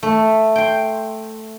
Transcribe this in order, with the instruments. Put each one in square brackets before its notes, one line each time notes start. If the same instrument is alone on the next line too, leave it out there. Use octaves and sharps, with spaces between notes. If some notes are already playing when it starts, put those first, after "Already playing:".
[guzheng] A3
G5 C6